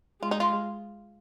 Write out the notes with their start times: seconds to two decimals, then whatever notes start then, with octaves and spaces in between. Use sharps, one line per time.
0.22 G#3 F4
0.31 D#4
0.40 F4